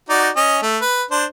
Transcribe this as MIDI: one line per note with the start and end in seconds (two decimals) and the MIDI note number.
0.09 0.30 63
0.09 0.30 66
0.09 0.30 74
0.36 0.59 61
0.36 0.59 75
0.62 0.78 57
0.81 1.03 71
1.11 1.25 62
1.11 1.25 72